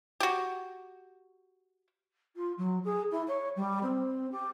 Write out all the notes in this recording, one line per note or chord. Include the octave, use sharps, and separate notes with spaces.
F#4 G4
F4
F#3
G#4
E4
C#5
G3
C4
G4